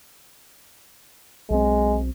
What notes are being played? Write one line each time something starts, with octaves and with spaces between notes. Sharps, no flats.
B1 G#3 C4